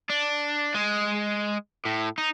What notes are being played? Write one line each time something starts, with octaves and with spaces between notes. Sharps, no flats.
D4
G#3
A2
D#4